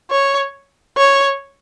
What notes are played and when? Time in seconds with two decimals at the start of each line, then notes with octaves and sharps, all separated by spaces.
0.11 C#5
0.97 C#5